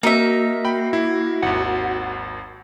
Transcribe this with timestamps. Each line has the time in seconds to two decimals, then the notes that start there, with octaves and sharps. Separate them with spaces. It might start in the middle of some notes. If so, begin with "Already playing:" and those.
0.03 A#3 D#4 F#4 E5
0.65 G5 B5
0.93 E4
1.42 G#1 D#2 F#5